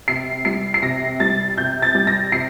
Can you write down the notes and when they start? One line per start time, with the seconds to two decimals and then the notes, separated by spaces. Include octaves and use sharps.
0.08 C3 C7
0.45 G3 C7
0.74 C7
0.82 C3 A#6
1.20 G3 A6
1.57 C3 G6
1.82 A6
1.95 G3
2.07 A#6
2.32 C3 C7